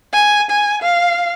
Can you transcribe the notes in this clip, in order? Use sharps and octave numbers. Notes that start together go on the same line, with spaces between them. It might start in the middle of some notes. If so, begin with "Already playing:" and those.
G#5
G#5
F5